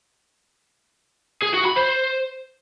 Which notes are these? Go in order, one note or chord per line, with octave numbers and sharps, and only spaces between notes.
G#4
F#4
B5
C5